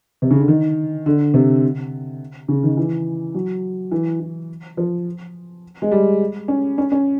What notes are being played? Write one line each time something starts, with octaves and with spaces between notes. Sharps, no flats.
C3
C#3
D3
D#3
D3
C3
C#3
D#3
E3
F#3
E3
E3
F3
G#3
G3
C#4
C#4
C#4